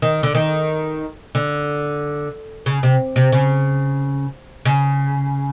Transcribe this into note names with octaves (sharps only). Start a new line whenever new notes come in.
D#3
D3
D#3
D3
C#3
C3
C3
C#3
C#3